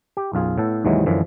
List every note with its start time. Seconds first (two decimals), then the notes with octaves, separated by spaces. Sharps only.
0.17 G4
0.33 B1 F#2 F4 G#4
0.58 A2 B3 A4
0.85 D#2 G#2 C3 E3 F#3 G#3
1.06 F#2 D3 E3 F3